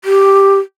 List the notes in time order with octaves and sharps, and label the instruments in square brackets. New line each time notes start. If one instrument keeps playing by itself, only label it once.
[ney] G4